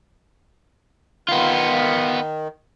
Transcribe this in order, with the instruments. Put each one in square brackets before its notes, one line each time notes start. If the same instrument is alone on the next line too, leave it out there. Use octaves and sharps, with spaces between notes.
[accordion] D#3 [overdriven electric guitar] B3 F4